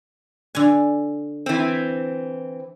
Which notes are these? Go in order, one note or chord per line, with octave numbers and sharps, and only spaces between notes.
D3 G#5
E3 C4